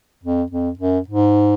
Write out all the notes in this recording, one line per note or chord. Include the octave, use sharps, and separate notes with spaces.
F2
F2
F#2
G#2